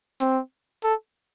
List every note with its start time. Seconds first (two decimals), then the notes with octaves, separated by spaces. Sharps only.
0.21 C4
0.84 A4